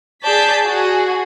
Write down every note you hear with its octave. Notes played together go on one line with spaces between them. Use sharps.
G#4 D5 A5 G6 B6
F#4 G#4